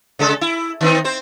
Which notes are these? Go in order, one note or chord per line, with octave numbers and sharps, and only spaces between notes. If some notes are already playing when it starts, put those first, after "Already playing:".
C#3 G#3 A4
E4
D#3 C4 D#4
C4 C5